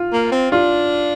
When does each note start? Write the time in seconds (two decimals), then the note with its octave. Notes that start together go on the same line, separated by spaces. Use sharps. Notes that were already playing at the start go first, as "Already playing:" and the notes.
Already playing: F4
0.13 A#3
0.32 C4
0.51 D4 F4